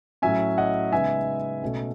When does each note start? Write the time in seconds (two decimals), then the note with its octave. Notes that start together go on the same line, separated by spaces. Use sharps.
0.22 A2 F#3 C#4 E5 G#5
0.58 D#5 F#5
0.92 C#3 G#3 B3 D#4 E5 G#5
1.62 B2 A3 C#4